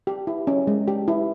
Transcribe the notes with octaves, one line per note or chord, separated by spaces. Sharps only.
G4
E4
C#4
G#3
G4
E4